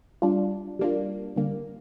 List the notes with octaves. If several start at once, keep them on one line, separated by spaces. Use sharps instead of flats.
G3 D4 F4
G3 A#3 D4 F4
D3 G3 A#3